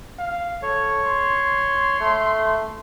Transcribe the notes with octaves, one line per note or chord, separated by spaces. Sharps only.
F5
A4 C#5
C6
A3